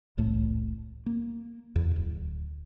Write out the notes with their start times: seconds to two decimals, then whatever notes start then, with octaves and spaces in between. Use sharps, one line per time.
0.17 E1 C2 A2 A3
1.06 A#3
1.76 E2
1.96 D1